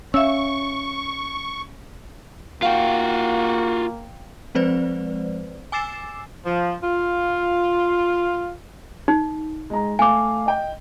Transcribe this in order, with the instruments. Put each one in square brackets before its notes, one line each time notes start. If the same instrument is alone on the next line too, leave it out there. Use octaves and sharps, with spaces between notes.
[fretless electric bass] C#4 [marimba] E5 F5 E6 [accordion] C#6
[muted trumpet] A#3 [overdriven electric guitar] F4 F#4 [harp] F5 G5
[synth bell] F3 G#3 C4 B4 C5 D5
G#5 D6 E6 A6 C7 E7
[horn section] F3
F4
[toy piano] D#4
[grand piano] G#3 A#5
[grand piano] A3 F5 [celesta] G#5 D6
[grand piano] D#5 G5